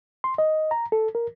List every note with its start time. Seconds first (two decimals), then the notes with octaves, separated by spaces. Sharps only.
0.24 C6
0.38 D#5
0.71 A#5
0.92 A4
1.15 A#4